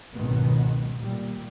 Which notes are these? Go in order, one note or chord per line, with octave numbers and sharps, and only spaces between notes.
G#1 C#2 F#2 B2 D#3 B3
A#2 G3